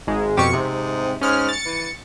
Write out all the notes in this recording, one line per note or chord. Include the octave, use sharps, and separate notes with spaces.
G#1 G#2 G#3
F2 B2 G4 C#6
G#2 C3
G#2 C#4 F6
A6 C#7
E3